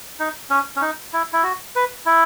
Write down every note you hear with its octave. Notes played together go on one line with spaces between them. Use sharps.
D#4
C#4
C#4
D#4
E4
E4
F#4
B4
E4